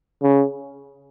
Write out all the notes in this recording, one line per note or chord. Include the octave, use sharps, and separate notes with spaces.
C#3